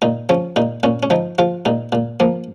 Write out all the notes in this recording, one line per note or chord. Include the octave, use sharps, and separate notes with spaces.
A#2 D#4
F3 C#4
A#2 D#4
A#2 C#4
C#4
F3 D#4
F3 F4
A#2 D#4
A#2
F3 A#3